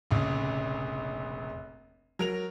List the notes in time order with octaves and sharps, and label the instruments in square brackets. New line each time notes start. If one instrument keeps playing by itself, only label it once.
[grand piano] F1 A#1 C#3
F#3 A#4 F7